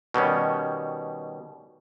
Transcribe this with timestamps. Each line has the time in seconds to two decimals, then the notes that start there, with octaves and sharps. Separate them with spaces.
0.14 B2 D#3 G3 C#4